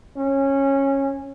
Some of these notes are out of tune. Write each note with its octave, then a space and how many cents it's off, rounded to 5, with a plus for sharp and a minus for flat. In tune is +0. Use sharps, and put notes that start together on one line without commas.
C#4 -15